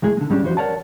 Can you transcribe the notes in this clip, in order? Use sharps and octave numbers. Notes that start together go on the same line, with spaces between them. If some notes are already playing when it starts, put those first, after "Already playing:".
C#2 A2 G#3 G#4
D3 G#3
G#2 G3 C#4 D4
F2 E3 F#4 C5
A#4 C#5 D5 F#5 A5